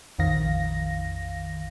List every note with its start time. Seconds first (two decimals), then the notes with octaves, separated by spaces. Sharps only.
0.19 A#1 F2 D#3 F5 A#6